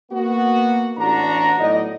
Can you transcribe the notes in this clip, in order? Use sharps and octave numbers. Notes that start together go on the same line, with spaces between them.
A#3 B3 F#4
A1 D4 F#4 A#5
A2 F#3 B3 D#4 D5 D#5